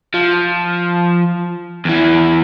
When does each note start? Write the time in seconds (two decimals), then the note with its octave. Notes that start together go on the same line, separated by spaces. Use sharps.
0.14 F3
1.85 E2 E3